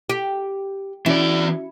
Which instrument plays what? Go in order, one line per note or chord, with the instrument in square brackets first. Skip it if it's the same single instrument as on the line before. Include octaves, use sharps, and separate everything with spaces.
[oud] G4
[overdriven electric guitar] E3 D5 [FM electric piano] C#4 F#4 [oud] E4